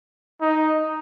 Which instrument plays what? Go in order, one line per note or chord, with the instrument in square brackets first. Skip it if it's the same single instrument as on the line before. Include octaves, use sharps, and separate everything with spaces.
[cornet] D#4